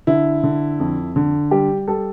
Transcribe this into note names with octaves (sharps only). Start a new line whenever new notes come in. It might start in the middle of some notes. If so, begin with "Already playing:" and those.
D3 E4
D3
F2
D3
G3 G4
G3 A4